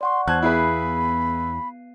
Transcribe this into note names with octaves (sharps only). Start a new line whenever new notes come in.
D5 F#5 C6 C#6
E2 C5 A5 F#6 G#6
B3 E4 G#4 B4 F5 B5 C7